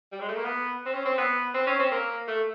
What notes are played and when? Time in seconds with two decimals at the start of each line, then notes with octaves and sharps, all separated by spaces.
0.12 G3
0.20 G#3
0.28 A3
0.36 A#3
0.44 B3
0.86 C4
0.93 C#4
1.06 C4
1.18 B3
1.54 C4
1.67 C#4
1.79 C4
1.91 A#3
2.28 A3